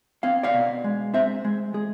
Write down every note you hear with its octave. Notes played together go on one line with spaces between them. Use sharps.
C4 F5
D5 F5
B2
G#3
C4 C5 E5
G#3
G#3 G#4